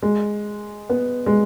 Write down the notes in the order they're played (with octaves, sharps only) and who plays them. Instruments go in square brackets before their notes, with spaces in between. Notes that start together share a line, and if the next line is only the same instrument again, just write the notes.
[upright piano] G#3
B3
G#3